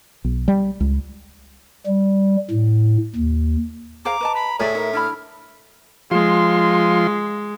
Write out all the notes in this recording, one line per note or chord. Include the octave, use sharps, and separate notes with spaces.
B1
G3
C#2
G3
A2
D#2
G#4 C5 F5 A#5 D6
B4 D#5 A5
B5
A2 G#4 D5 E5
D#4 A#4
D4 E4 B5 F6
F3 G#3 F4 C6